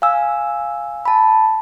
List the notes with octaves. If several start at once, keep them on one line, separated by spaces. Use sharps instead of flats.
F5 G#5 E6
A5 B5